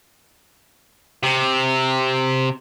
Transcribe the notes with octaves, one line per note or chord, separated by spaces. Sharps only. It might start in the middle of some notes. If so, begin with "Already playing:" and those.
C3